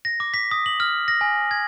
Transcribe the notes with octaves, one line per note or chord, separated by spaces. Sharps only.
A#6
D6
B6
D#6
F#7
F6
A#6
G#5
G#6